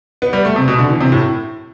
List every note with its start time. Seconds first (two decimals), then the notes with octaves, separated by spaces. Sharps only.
0.22 B3
0.33 G3
0.45 A3
0.56 C3
0.68 B2
0.79 D3
0.90 E3
1.01 C3
1.12 A2